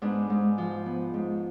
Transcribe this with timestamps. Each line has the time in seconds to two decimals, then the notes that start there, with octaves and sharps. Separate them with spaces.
0.02 G#2 B3 D4
0.30 G#2
0.58 F3
0.86 B3
1.14 G#2